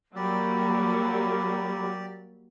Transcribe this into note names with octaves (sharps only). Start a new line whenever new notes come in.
F#3 G3 A#3 G4 A4 D5 A#5 B5